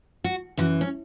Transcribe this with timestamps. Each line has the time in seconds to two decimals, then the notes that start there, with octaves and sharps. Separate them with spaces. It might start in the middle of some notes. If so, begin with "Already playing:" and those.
0.24 F#4
0.57 F#2 E3 F#4
0.81 C#4